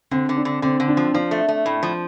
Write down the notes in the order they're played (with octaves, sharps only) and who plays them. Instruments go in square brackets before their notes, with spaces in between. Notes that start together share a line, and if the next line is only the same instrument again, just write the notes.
[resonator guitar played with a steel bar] D3 [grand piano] C4
[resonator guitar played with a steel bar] D3
[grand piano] D4
[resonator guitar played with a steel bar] D3
[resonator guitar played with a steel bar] D3 [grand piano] C4
[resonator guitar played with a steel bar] D3
[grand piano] D4
[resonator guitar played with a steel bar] F3
[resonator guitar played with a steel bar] F3 [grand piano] D4
[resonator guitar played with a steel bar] A3
A3
A2
F3